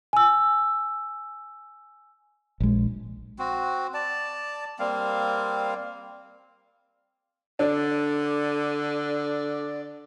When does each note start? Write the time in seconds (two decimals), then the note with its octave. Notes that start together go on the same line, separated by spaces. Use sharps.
0.13 G#5 E6
2.60 A#1 G#3
3.39 C4 F#4
3.94 D5 A5
4.79 G3 A#3 C4 F5
7.59 D3 D4 D5